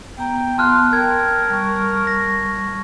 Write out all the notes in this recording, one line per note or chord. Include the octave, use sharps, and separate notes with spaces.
B3 G5 A#5
B3 F4 A5 F6 F#6
A#4 G5 G#6
G3 C#6
A#6